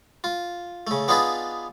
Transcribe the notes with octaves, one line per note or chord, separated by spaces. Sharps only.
F4
C#3 A3
B3 D4 D#4 F4 G#4 B4